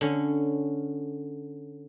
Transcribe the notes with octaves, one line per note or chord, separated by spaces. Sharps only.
D3 C#4